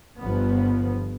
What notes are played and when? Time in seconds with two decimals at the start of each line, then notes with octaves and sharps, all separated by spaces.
0.20 G1 G2 F3 B3